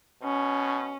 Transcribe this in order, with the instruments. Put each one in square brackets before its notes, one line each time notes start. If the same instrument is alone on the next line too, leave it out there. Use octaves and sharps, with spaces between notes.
[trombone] B2 [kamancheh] C#4